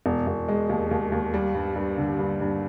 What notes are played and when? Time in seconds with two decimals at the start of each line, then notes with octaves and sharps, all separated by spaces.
0.06 E1
0.27 E1
0.48 G#3
0.69 D#2
0.91 D#2
1.12 D#2
1.34 G3
1.55 G2
1.76 G2
1.98 D3
2.19 G2
2.41 G2